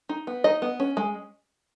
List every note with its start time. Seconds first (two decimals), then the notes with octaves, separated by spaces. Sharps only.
0.09 D#4
0.27 B3
0.44 D#4 D#5
0.62 B3
0.80 C#4
0.97 G#3